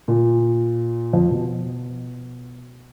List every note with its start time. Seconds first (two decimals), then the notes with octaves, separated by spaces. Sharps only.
0.08 A#2
1.13 F2
1.31 B2